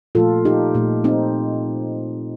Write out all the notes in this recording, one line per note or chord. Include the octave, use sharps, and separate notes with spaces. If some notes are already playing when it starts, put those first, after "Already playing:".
A#2 F3 A3 F4 A4
D#4 G4
A#2 A3
C4 D#4